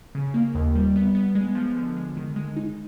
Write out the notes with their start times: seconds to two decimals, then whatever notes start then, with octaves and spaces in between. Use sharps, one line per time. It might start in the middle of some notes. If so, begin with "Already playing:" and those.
0.15 C#3
0.34 A#3
0.55 D#2
0.75 G3
0.96 B3
1.15 B3
1.35 G#3
1.55 F3
1.76 D3
1.97 G#3
2.17 D#3
2.36 G#3
2.57 D#4